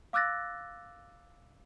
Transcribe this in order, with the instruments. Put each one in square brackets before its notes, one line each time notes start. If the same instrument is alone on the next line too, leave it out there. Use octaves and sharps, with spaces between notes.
[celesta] F5 D6 E6 F#6 A6 A#6